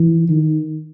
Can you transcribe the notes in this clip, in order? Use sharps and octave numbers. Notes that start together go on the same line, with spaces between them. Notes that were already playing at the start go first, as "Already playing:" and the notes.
Already playing: E3
D#3